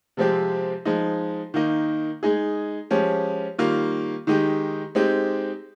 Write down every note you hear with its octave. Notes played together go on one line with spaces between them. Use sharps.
C3 F3 G#3 C4 G4
F3 G#3 D#4
D#3 A#3 D#4
G#3 D#4 G#4
F3 G#3 C#4 G4
D#3 G3 A#3 F4
D#3 G#3 D#4 G4
G#3 C4 D#4 G4